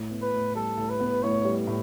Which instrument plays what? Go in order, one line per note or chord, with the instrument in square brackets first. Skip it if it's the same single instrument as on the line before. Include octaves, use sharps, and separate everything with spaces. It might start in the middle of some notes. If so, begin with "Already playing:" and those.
Already playing: [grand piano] A2
B3
[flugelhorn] B4
[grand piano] A2
[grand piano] G3 [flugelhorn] A4
[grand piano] A2
[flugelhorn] B4
[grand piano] B3
[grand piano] A2 [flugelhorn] C#5
[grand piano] G3
A2